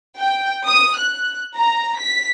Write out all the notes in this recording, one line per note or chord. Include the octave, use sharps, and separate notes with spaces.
G5
D#6
F#6
A#5
B6